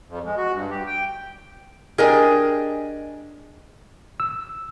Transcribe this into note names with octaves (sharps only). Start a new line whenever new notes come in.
F2
G#3
F#4
G2
G4
G5
D4 G4 G#4 A#4 D#5 G#5
E6